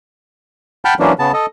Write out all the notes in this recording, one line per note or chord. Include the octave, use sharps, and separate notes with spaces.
F#5 G5 A5 B5 F6 G6
E3 F#3 A#3 C#4 D4
C#3 B3 A5
A4 D#5